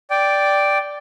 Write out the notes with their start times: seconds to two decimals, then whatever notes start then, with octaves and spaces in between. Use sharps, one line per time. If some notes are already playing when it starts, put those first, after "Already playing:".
0.10 D5 G5